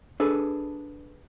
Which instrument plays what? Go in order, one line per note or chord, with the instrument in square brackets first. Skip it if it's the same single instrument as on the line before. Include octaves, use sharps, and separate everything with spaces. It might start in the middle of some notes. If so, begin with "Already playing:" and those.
[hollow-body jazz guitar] D4 G#4 A4 B4